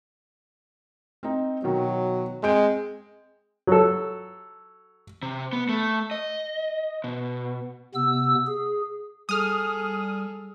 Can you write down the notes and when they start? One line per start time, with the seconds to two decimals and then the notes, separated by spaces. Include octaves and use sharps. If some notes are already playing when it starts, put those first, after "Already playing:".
1.23 C4 D#4
1.64 B2 D#3 F#3
2.43 G#3 C4 G6 D7
3.67 F#3 A4
5.23 C3
5.53 B3
5.69 A3
6.11 D#5
7.04 B2
7.95 C3 B3 E6
8.47 G#4
9.29 G3 G#4 A4 D#6 F6